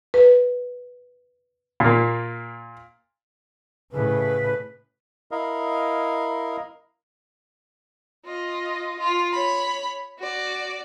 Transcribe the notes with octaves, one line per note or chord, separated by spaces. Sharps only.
B4
A#2 A#3
A2 C#3 B4
E4 A#4 D#5 F5
F4 D#5
F4
C#5 B5
F#4 D5